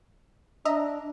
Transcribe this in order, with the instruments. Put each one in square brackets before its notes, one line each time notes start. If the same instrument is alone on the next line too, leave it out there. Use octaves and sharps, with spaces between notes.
[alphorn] D4 [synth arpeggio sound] D#5 E5 A#5